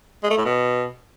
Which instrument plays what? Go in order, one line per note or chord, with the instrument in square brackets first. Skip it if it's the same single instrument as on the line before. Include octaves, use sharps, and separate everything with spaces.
[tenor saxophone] G#3
A3
A2
B2